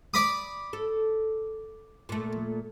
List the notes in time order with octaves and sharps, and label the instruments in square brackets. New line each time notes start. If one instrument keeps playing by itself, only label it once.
[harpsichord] D5 B5 D#6
[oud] A4
A#2 A3